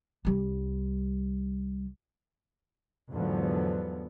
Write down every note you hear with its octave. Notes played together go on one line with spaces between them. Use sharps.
C2 G3
E2 G#2 D3 F3 F#3 B3